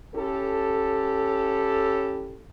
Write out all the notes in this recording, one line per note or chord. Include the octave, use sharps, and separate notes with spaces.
C#4 E4 G4 A4